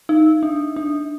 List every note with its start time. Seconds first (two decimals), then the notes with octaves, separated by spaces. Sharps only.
0.09 D#4
0.43 D4
0.76 D4